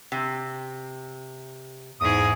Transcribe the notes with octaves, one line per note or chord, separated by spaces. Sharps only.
C3
E2 G#2 G#4 D#6